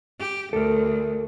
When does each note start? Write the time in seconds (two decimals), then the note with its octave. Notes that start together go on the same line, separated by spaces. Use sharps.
0.20 G4
0.53 D2 A4 A#4